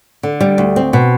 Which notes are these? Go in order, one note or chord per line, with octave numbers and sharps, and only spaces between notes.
D3
G3
D2
C4
B2